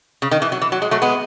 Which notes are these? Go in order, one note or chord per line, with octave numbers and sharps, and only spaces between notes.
C#3
D#3
E3
F#3
E3
F#3
G#3
F#3 A3
G#3 B3